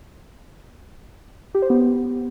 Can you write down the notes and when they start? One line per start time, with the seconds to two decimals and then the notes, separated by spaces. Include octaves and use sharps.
1.55 G4
1.62 C5
1.70 B3